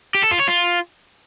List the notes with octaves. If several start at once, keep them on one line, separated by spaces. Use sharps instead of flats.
G4
A4
F4
C#5
F4